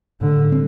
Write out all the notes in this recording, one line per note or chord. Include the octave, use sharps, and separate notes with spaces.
A2 D3
G3 C4